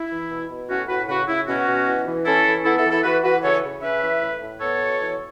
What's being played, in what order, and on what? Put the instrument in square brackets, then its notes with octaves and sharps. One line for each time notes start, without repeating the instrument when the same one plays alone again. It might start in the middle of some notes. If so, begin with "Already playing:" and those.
Already playing: [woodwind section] E4
E3
B2
B2
A2 C#4 F#4
A2 F#4 B4
C#3 F#4 B4
C#3 E4
B2 C#4 F#4
B2
E3
E3
C#4 E4 A4
E3
B3 E4 A4
E4 A4
E3
E4 A4
E3 F#4 B4
E3 F#4 B4
C#3 A4 C#5
C#3
C#4 B4 E5
E3
A2
A2
B3 A4 C#5
B2
E3